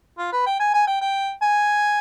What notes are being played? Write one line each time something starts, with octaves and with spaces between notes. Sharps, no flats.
F4
B4
G5
G#5
G#5
G5
G5
G#5